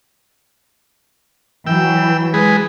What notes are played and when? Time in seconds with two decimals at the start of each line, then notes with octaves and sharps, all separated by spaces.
1.67 E3 F#3 G5 E6
2.34 G#3 G#4 B4